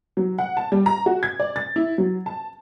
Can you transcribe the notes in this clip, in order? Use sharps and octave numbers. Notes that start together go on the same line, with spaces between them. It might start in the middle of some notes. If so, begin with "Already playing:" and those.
F#3
F#5
A5
G3
A#5
F#4
G#6
D5
A6
E4
F#3
A5